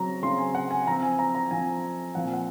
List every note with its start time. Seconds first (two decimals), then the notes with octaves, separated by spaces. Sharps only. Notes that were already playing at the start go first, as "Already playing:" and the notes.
Already playing: C#3 F#3 C4 A#5
0.22 C#3 F#3 C4 C6
0.38 G#5
0.55 F#5
0.71 G#5
0.87 F3 A#5
0.91 C4
1.03 G#5
1.19 A#5
1.35 A#5
1.51 F3 C4 G#5
2.15 A#2 F3 C4 F#5
2.24 G#5
2.33 F#5